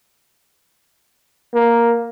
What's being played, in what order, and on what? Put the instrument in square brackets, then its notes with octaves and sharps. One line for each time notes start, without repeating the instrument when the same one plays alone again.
[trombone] A#3